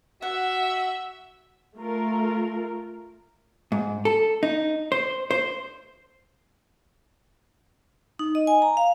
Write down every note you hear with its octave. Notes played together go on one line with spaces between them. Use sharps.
F#4 E5 F#5
A3 F4 A#4
G#2
A4
D#4
C5
C5
D#4
D#5
G#5
A#5
F5